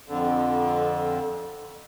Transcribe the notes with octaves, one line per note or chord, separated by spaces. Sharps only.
F2 D3